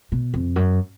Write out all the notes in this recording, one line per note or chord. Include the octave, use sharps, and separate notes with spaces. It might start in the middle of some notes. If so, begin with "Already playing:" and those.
B2
F2
F#2